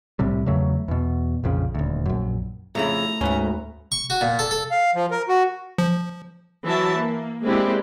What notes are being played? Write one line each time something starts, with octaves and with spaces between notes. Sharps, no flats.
C2 A2 C3 G3
E2 C#3 F#3 A3
E2 B2
A#1 F2 C#3
D#1 D2
A#1 F#2
F2 C#3 A3 E4 A#5
D2 G#2 A3 C#4 B4
C#6
F#4
A#2
A4
A4
F5
F3
A#4
F#4
F3
E3 F#3 E5 A5
A#3
G#3 A#3 C4 D4 E4 G4